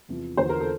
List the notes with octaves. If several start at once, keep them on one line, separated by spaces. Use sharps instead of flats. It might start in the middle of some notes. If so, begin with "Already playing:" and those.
E2 C3 F3
E2 D3 F3 C5
A#4
A4